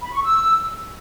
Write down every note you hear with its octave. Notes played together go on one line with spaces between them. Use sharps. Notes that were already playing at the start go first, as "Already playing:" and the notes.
B5
C#6
E6